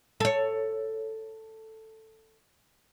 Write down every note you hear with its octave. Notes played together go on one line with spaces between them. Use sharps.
A4 C#5